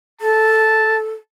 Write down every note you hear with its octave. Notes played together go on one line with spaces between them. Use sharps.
A4 A5